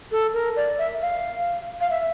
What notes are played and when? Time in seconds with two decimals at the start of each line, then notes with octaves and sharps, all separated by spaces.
0.12 A4
0.34 A#4
0.56 D5
0.78 E5
1.02 F5
1.81 F5
1.91 E5